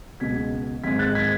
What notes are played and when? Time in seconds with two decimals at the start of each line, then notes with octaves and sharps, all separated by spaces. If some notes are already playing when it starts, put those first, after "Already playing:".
0.20 C#2 B2 G#3 G#6 B6
0.84 G#1 G#2 G#3 G#6 B6
0.99 F#6 A6
1.15 G#6 B6